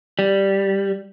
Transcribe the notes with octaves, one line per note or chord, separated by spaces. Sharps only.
G3